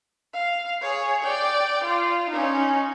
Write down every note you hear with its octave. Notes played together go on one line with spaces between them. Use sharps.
F5
G#4 C#5
D5 G5
F4
C#4 D#4